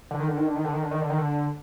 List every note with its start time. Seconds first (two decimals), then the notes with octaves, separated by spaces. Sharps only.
0.11 D3
0.20 D#3
0.28 D3
0.37 D#3
0.46 D3
0.56 D#3
0.64 D3
0.73 D#3
0.82 D3
0.91 D#3
1.01 D3
1.10 D#3
1.18 D3